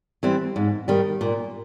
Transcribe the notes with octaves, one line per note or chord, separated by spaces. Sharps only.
E3 G3 C4
G#2
D#3 G3
A#2